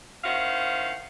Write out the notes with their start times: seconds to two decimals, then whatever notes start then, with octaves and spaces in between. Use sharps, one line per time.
0.24 D#3 C#4 E4 C5 F5 F#5